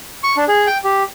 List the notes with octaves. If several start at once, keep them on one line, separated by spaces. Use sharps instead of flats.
C#6
D4
G#4
G5
G4